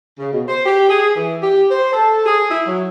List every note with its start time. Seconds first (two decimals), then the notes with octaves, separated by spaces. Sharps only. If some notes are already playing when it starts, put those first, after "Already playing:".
0.19 C#3
0.32 B2
0.48 C5
0.66 G4
0.89 G#4
1.16 E3
1.42 G4
1.71 C5
1.93 A4
2.25 G#4
2.50 E4
2.67 F#3